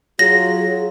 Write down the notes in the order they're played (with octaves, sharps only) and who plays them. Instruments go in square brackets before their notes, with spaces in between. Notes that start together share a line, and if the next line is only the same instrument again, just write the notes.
[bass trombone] F#3 [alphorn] F4 [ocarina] G#4 [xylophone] A#6